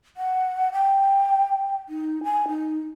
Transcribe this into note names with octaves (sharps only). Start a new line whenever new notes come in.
F#5
G5
D#4
G#5
D#4